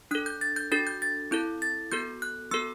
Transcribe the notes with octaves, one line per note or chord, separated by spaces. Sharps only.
D4 A4 F#6
G6
A6
G6
D4 F#4 A4 A6
G6
A6
C4 E4 A4 G6
A6
B3 F#4 A4 G6
F#6
B3 F#4 A4 E6